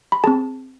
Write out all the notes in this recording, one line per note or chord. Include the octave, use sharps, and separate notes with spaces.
B5
C4 G#4 A5